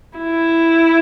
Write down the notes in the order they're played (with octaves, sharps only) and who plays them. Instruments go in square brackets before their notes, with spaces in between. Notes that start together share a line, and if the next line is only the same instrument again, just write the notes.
[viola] E4